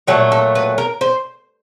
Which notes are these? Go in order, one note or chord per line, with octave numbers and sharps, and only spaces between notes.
A#2 F#3 A3 A4
A4
B4
A#4
C5